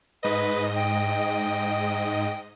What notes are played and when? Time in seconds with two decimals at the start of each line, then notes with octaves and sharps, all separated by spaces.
0.23 G#2 B4 D#5
0.76 G5